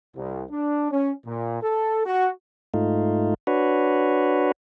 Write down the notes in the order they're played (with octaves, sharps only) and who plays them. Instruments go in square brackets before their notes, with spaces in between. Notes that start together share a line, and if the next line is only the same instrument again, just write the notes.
[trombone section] C2
D4
C#4
A#2
A4
F#4
[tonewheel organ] G#2 A3 D#4 F4
D4 F#4 B4 C#5